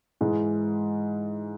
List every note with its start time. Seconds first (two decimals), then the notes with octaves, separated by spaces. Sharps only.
0.21 G#2 E3 G#3